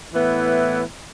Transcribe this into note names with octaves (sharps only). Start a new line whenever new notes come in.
A2 E3 B3 E4